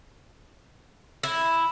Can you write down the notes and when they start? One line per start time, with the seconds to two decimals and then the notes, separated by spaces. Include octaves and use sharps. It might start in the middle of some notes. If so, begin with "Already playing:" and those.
1.23 E4